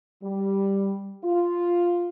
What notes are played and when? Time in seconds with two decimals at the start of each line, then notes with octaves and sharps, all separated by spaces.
0.22 G3
1.24 F4